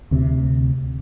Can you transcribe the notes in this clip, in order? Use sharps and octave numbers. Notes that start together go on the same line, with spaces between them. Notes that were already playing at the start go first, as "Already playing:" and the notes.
D2 C3